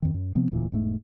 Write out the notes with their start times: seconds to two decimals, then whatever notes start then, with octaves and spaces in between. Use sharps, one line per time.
0.02 F2 D#3
0.14 F#2
0.35 C3 F3 B3 C4
0.51 E1 D2 A#2 E3
0.72 E1 G#2 A3